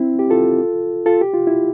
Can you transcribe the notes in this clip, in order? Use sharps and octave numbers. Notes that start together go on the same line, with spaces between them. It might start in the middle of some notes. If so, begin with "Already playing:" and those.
Already playing: C4 E4
G4
F4 A4
F4 A4
G4
F4
E4